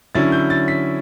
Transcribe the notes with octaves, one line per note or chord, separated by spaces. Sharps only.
D3 F#3 C#4 E4 A6
G6
A6
B6